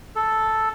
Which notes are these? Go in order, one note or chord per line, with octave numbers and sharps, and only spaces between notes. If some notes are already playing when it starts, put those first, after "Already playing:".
A4